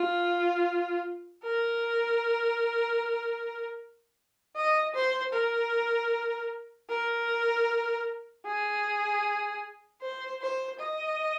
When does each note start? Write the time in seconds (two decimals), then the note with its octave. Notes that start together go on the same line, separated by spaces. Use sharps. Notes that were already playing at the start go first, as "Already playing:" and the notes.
Already playing: F4
1.44 A#4
4.56 D#5
4.94 C5
5.33 A#4
6.90 A#4
8.46 G#4
10.02 C5
10.42 C5
10.80 D#5